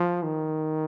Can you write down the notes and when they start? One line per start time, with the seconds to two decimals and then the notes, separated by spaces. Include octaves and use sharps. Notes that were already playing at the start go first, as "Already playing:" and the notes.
Already playing: F3
0.23 D#3